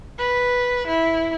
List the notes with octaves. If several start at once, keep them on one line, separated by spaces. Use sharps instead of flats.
B4
E4